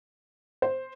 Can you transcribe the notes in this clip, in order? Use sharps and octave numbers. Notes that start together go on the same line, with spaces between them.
C5